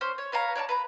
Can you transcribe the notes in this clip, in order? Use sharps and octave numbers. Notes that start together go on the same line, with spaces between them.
C#4 C5
C#5
B4 C#5 F5 A#5
C#5 D5 F5 A5
B4 A#5 B5